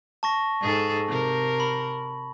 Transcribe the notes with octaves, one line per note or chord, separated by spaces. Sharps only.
A5 C#6 A#6
G#2 G#4 A4
C3 A#4
B5